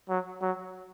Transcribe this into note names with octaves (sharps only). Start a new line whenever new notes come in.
F#3
F#3